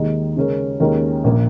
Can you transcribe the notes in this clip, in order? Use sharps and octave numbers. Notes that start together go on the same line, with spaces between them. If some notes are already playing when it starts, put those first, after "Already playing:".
Already playing: D#2 D#3 G#3 D#4
C#3 G#3 C#4 A#4
D#2 D#3 G#3 C#4 A#4
A#1 A#2 A#3